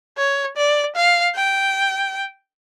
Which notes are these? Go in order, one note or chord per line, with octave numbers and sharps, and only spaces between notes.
C#5
D5
F5
G5